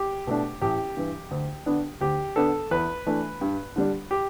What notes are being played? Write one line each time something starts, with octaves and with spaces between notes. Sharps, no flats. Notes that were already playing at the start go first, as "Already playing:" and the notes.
Already playing: G4
B2 A3 D4
A1 G4
G2 E3
D2
D3 B3 D4
D2 G4
D3 B3 D4 A4
E2 B4
E3 A3 D4
G2
D3 G3 D4
G4